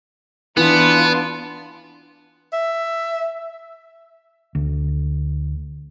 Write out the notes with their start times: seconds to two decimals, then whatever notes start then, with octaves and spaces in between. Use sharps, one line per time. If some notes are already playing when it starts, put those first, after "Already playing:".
0.57 E3 B3 D4 F4
2.53 E5
4.55 D2